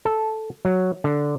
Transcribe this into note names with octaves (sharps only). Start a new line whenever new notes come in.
A4
F#3
D3